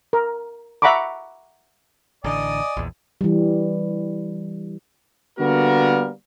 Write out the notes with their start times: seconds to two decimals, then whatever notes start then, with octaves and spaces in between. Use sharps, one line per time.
0.13 A#4
0.82 E5 F#5 A#5 B5 C#6 D6
2.24 A1 D3 D5 D#5 G#5
2.77 A#1 E2
3.21 E3 G3
5.39 D3 G3 A#3 B3 F#4 A#4